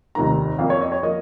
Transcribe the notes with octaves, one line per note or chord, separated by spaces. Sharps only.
F1 D#2 D#3 A#3 A#5
F2 F3 A#3 F5
C#5
D#5
C#5
F3 A#3 D#5